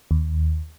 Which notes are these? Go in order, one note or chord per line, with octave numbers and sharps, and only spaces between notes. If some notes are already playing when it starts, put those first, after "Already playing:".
D#2